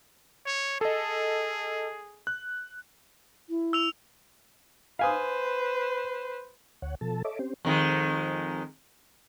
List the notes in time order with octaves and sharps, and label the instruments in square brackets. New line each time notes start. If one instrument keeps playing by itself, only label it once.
[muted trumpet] C#5
[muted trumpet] G#4 [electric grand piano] A4 D#5
[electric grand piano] F#6
[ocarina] E4
[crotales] E6 F7
[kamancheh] B4 C5 [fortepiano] F5 G#5 D#6
[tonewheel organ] D2 C#5 F#5
B2 F3 A4 A5
A4 C#5 D#5 E5 D6
C4 C#4 G4 C5
[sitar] F2 D#3 G#3